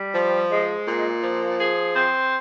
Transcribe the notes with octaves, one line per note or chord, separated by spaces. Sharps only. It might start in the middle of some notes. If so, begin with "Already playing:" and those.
Already playing: G3
F3
G#3
A#2
F3
G#4
C4